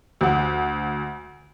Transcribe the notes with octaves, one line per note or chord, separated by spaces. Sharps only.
D2 F#5